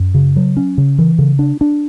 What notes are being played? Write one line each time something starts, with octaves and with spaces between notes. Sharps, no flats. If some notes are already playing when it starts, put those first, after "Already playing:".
Already playing: F#2
C#3
F#3
C#4
C#3
E3
C#3
D4
D4